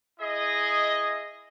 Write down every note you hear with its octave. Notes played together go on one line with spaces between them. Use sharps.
E4 G#4 D#5